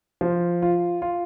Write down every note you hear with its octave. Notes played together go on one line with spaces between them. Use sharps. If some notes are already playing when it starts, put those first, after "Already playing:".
F3
F4
F4